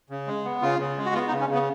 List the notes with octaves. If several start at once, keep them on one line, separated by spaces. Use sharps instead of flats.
C#3
G#3
B3
C#3 F4
C#3
G#3
F#4
B3 F4
D#4
C#3
C#4
C#3 B3